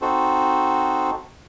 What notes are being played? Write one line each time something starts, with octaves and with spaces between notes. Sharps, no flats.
C4 D#4 F#4 A4 C5